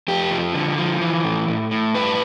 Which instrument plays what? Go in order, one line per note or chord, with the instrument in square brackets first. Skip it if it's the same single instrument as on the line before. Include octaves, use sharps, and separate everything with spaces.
[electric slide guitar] F2 G4
F3
D3
F3
E3
A2
A2
A2
G2 B4